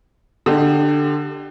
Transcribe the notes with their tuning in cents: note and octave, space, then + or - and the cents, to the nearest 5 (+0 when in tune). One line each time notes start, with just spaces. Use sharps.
D3 +10 D#4 -25 G4 +0